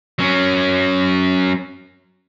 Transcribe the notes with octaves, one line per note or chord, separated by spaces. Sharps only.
F#3 C#4